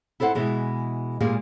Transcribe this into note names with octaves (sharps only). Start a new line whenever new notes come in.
E4 A4 C5 E5 F#5
B2 E3 G#3
A#2 G3 G#3 A#3 G#4